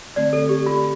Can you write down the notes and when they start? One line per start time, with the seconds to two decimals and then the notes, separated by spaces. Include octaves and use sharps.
0.16 D3 A3 C4 D5
0.33 A4
0.49 G4
0.66 F4